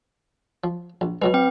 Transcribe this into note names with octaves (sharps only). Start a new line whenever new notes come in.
F3
A#1
B2 F#3 G#3 B4
C4 G5